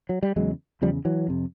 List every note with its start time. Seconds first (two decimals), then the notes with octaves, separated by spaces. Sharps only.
0.09 F#3
0.23 G3
0.36 E2 C#3 F#3 G#3
0.82 E2 C#3 F3 G3
1.05 E3 F#3
1.28 F2 C3